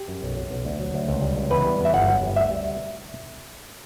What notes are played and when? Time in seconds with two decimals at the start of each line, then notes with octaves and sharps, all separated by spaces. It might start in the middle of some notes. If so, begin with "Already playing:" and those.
Already playing: G4
0.08 F#2
0.23 B1
0.36 F#3
0.51 B1
0.65 D2
0.80 F#3
0.94 D2
1.08 C#2
1.22 G3
1.36 C#2
1.50 E2 B4
1.65 G3
1.80 E2
1.85 E5
1.94 G1 F#5
2.08 F#3
2.22 G1
2.36 D2 E5
2.51 G3